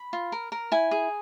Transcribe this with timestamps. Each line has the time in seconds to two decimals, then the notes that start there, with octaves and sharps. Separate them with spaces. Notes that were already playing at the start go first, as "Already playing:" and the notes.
Already playing: B5
0.13 F4
0.32 A#4
0.52 A#4
0.72 E4 G#5
0.91 G#4